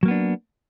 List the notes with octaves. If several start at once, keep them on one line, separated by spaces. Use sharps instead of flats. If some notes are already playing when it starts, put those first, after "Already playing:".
F#3 A#3 B3 D4